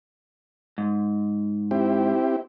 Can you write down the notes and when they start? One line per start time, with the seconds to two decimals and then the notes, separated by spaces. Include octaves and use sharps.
0.78 G#2
1.71 C4 E4 G4